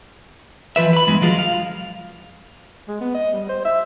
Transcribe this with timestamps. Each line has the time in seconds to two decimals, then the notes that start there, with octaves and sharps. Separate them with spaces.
0.76 E3 F3 B4 E5
0.93 B4 B5
1.07 E2 G2 G#3
1.22 F3 F#3 G#3 F4
1.39 F5
2.88 G#3
3.01 B3
3.15 D#5
3.33 G3
3.49 C5
3.65 E5